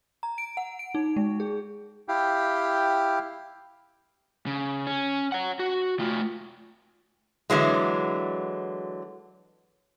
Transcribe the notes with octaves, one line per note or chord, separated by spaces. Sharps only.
A#5
D7
F#5
D7
D#4
G#3
G#4
E4 G4 F5 G5
C#3
C#4
C#5 F#5
F#4
A3 F4
D3 E3 F#3 G#3